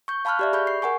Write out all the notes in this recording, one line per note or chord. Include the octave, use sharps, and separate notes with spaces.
C#6 G6
F5 A5 B5 C#6 F6 F#6
G4 D5 E5
G#4 B5 C#6 G6
C7
A#4 F#5 G#5 C#6